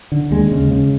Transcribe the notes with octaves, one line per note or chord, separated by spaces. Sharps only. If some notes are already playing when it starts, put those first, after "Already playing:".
D3
D#2 G#3
C#3
C#3